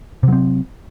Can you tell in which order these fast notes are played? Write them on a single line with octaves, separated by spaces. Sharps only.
C3 F#3 C4